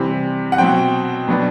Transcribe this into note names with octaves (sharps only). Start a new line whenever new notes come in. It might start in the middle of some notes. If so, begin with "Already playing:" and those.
Already playing: C3 E3 G3 C4
F#5
B2 F#3 C4 G5
B2 F#3 B3 D4